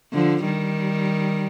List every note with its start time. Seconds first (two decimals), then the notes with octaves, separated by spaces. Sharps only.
0.13 D3 F3
0.44 D#3 G3